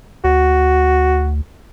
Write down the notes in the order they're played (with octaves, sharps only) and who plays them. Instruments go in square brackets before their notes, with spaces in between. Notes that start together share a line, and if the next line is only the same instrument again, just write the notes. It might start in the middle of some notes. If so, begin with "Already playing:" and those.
[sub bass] D2 [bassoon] F#4